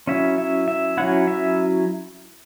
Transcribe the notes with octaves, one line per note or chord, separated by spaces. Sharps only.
F#3 C#4 E4 E5
E5
E5
F#3 C#4 E4 F#5
E5